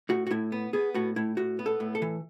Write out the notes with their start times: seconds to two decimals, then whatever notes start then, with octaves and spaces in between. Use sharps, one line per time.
0.09 A2 F#4
0.27 F#4
0.31 A2 E4
0.52 B3
0.73 B3 G#4
0.94 A2 F#4
1.16 A2 E4
1.37 A2 F#4
1.59 B3
1.66 A4
1.80 A2
1.95 A4
2.02 E3